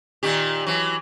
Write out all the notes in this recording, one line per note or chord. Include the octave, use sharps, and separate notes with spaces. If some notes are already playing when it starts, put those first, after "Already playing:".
A#2 D#3 G4
E3 F#3